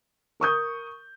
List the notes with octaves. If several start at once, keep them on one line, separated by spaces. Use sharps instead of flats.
A#4 C#6 D#6 G6